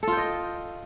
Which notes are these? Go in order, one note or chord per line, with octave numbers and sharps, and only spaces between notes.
F4 A4 D#5 G5